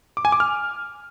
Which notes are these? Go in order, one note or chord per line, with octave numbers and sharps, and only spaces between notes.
D6
G#5
D6
F6